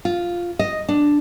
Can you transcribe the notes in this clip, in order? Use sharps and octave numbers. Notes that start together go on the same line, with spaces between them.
F4
D#5
D4